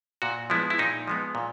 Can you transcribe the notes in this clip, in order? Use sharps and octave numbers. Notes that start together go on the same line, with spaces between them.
A#2 F#4
F3 G#3 B3 E4
E4
A#2 D#4
F3 G#3 B3
A#2